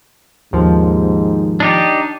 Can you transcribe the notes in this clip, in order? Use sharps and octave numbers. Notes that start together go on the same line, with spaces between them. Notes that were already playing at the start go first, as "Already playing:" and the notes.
D#2 G#2 F3
D4 D#4 G4